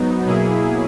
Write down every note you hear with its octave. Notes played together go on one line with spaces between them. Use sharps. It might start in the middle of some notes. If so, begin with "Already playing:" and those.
Already playing: G#2 F#3 B3 D#4
B2 F#3 A#3 E4 G#4